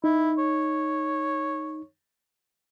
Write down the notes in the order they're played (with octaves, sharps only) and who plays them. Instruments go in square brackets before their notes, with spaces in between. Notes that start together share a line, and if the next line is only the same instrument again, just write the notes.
[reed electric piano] D#4 [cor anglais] E4
[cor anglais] C#5